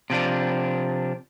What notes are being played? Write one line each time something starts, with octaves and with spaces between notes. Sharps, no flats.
C3 F3 D4